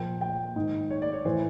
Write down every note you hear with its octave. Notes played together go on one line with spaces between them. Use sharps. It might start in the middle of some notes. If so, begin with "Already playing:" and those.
Already playing: A#2 F3 G5
G5
G#2 D#3
C#5
D5
C#5
A2 E3 C5